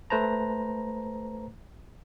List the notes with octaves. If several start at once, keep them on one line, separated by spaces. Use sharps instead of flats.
A3 B4 C5 A5 A#5